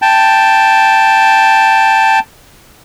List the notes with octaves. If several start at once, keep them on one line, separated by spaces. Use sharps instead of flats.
G5 A5